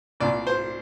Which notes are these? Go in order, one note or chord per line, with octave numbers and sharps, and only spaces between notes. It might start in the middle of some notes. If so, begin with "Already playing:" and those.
C2 A#2 D5
C5